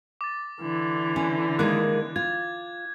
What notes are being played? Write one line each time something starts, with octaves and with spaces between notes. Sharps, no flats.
D6 A6
D3 E3
C#4
D#3 G#3 A#3 F#6 G#6
F4 G#6